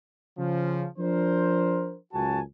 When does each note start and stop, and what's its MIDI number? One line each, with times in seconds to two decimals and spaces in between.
0.38 0.86 49
0.38 0.86 53
0.98 1.96 53
0.98 1.96 62
0.98 1.96 70
0.98 1.96 72
2.13 2.40 37
2.13 2.40 42
2.13 2.40 66
2.13 2.40 80
2.13 2.40 81